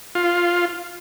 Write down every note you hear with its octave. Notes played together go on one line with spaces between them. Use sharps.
F4